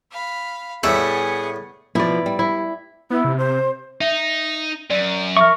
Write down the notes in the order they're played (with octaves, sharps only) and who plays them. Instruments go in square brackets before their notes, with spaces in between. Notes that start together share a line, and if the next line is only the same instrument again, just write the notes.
[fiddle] F5 B5
[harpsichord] A2 G3 A3 [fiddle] B3 F#5 [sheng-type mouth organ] G#4 G#5 [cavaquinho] E5
[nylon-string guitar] B2 F3 [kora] E4 D5
[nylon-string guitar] G3
[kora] E4
[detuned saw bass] B3 [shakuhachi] E4
[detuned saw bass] C3
[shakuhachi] C5
[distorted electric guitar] D#4 [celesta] E5
[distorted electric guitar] F#2 [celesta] D5 D#7
[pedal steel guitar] A#4 C#6 [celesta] E5 F6